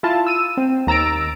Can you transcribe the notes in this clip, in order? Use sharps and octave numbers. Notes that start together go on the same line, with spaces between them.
E4 F4 A5
E6 D#7 E7
C4
D#2 A#5 E6 A6 D7